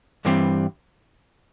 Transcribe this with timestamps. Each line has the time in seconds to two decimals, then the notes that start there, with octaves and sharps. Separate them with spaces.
0.25 G2 E3 G3 C4